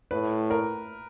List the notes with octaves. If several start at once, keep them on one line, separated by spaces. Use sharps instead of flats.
A2 B4
A#4